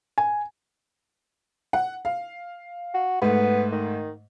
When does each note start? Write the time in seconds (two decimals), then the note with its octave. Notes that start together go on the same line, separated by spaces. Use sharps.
0.18 G#5
1.73 F#5
2.05 F5
2.94 F#4
3.22 G#2 A3 B3
3.72 D#3